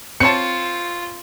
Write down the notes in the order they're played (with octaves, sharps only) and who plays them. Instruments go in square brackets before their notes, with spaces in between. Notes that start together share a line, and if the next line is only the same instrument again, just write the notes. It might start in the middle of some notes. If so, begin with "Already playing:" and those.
[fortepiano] C4 C#5 A5 [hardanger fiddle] F4 [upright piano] C#7